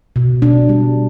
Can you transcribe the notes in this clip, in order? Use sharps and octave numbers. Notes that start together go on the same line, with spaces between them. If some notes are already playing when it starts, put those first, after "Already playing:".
B2
B2 D4
G3